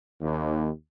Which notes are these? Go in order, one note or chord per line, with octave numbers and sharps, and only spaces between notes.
D#2